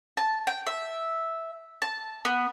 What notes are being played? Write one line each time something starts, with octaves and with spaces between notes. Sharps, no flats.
A5
G5
E5
A5
B3